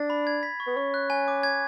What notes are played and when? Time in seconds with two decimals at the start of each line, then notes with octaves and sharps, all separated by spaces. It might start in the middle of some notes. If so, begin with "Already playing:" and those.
Already playing: D4 A6
0.10 B5
0.27 G#6
0.43 B6
0.60 C#6
0.67 B3
0.76 C#4 C#6
0.94 F#6
1.10 G#5
1.28 D6
1.43 G#6